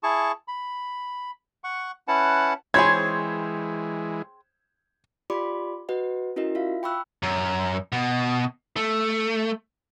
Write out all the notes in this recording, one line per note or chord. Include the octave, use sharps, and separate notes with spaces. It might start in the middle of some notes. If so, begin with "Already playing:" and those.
E4 G#4 A5 C#6
B5
F#5 C#6
C#4 E4 B4 F#5 A5
E3 G#3 C4 G#4 C5 C#5 B5 G#6
F4 G4 D5 B5 C6 D6
F#4 B4 D#5 F#5
C#4 E4 F#4 A#4 D#5
F4 E5 F5
G5 B5 C#6 E6 F#6
F#2
B2
A3